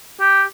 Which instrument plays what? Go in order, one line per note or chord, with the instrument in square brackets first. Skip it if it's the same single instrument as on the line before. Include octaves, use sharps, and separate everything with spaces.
[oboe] G4